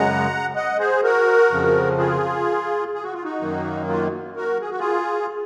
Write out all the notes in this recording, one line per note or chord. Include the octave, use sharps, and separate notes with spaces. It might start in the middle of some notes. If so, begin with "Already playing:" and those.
Already playing: F#2 C#3 G#3 F#5 A#5
D#5 F#5
G#4 C5
F#4 A#4
F2 C#3 F3
F4 G#4
G#4
F#4
F4
D#4 F#4
F#2 D#3 F#3 A#3
F4
F#4 A#4
G#4
F#4
F4 G#4